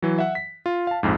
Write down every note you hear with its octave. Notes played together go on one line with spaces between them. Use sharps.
E3 F#3
E5 F#5
B6
F4
F5 A5
A#1 F2 G#2